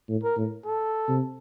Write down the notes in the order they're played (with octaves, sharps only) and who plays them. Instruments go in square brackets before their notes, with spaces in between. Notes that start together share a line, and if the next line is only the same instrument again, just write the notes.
[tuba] A2
[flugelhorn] A#4
[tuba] A2
[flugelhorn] A4
[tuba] C3